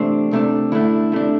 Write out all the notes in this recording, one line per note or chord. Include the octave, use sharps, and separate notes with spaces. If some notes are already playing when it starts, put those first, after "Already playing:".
Already playing: E2 C3 A3 C4 D4
C2 C3 A3 D4
D2 D3 A3 D4 E4
C3 A3 D4